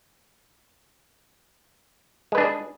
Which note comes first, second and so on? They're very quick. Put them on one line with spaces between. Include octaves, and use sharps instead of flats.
G#3 B4 D4 G#4